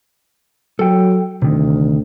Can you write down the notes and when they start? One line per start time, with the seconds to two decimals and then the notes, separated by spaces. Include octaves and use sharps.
0.79 F#3 A4 G5
1.42 D2 C3 D#3